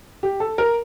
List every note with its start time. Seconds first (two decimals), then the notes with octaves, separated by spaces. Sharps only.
0.23 G4
0.40 A4
0.58 A#4